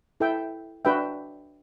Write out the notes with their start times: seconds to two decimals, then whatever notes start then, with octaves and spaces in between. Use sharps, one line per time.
0.20 E4 A4 E5 G5
0.85 D4 F#4 B4 E5 G5